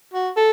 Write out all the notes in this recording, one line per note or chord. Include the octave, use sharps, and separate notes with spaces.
F#4
A4